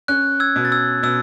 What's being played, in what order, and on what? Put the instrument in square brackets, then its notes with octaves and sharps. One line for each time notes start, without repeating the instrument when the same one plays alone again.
[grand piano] C#4 [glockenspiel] F#6
[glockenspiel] E6 G#6
[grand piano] B2
[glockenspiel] A6
E6 G#6
[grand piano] B2 [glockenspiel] E6